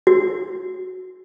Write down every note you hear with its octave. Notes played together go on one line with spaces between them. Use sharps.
F#4